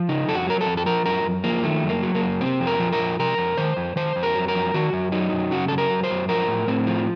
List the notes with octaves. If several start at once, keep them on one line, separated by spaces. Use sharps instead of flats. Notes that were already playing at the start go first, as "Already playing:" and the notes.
Already playing: F3
C#3 D#4
F2 A4
F#4
F#3 A#4
A4
F2
A4
F3 A#4
F#2 A#4
F#2
F3 A#3
D#3 A3
F#2
A#3
F#3
A#3
F#2
C3 C4
F2
A#4
F3
A#4
F2
C3 A#4
F2
D#3 C5
F2
D#3 C5
F2
A#4
F#3
A#4
F2
D#3 F#4
F#2
F#3 D#4
F#2
C#3 F#4
F#2 A4
A#4
F#3
C5
F#2
F3 A#4
A2
A2 C4
F3